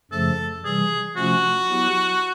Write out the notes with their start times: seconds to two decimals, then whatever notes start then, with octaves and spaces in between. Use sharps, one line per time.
0.11 F#2 C#3 F3 A3 A4
0.64 C3 E3 G3 G#4
1.16 C3 F3 A3 C#4 F4 F#4
1.69 F#3 B3 E4 G4